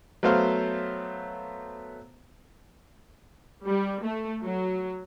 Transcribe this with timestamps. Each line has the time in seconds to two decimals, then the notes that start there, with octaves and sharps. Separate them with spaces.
0.23 F#3 A3 B3 C5 F5
3.67 G3
4.02 A3
4.42 F#3